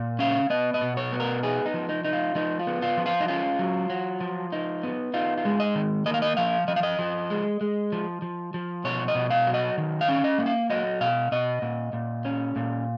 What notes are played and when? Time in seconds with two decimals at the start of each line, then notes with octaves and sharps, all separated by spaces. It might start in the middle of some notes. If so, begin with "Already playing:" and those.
Already playing: A#2
0.19 C#4 F5
0.50 B3 D#5
0.74 D#5
0.81 B2
0.97 C#5
1.13 B3
1.20 A#4
1.43 D#4 G#4
1.66 D#4
1.74 F3
1.89 D#4
2.05 D#4
2.13 F4
2.35 F3 D#4
2.59 F4
2.67 B3
2.82 F4
2.97 F3
3.06 F4
3.20 D#4
3.28 C#4 F4
3.59 F#3
3.90 F#3
4.20 F3
4.52 D#4
4.83 B3
5.14 D#4 F4
5.38 F4
5.45 G#3
5.60 D#5
5.75 D#3
6.06 A#3 D#5
6.14 F5
6.22 D#5
6.37 F3 F5
6.68 F3 D#5
6.76 F5
6.83 D#5
6.99 F3
7.30 G#3
7.61 G#3
7.92 F3
8.22 F3
8.54 F3
8.84 B2 C#5
9.08 D#5
9.15 B2
9.30 F5
9.47 F#3
9.54 D#5
9.78 D#3
10.01 F5
10.08 C#4
10.24 D#5
10.39 A#3
10.46 F5
10.70 F#3 D#5
11.01 B2 F5
11.32 B2 D#5
11.62 A#2
11.93 A#2
12.25 C#4
12.56 A#2